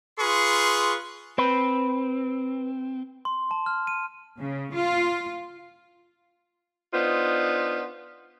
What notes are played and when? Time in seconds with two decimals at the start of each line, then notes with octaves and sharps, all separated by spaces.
0.19 F4 G#4 B4 C6 C#6
1.38 C4 B4
3.25 C6
3.51 A5
3.66 F6
3.87 D#7
4.39 C#3
4.74 F4
6.94 B3 D4 D#4 F4 C5